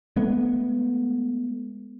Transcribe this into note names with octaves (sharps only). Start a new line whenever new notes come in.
G#3 A3 B3